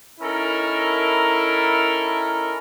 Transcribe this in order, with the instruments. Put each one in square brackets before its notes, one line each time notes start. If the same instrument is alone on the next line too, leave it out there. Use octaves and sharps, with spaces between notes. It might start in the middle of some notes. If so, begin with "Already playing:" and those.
[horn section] C#4 D#4 E4 A4 A#4